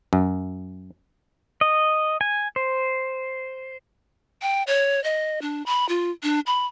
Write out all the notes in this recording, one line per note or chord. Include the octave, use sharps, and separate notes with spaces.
F#2
D#5
G#5
C5
G5
C#5
D#5
D4
B5
F4
D4
B5